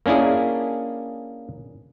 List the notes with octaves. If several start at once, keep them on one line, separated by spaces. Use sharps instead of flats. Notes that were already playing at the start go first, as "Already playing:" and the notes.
A#3 C#4 D4 E4 G#4